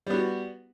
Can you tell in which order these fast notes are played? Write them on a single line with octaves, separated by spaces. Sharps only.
G3 B3 F#4